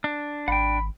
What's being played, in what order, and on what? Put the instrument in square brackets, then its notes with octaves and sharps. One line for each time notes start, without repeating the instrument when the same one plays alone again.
[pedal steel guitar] D4
[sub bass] G#1 [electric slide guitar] F#5 G5 [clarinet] B5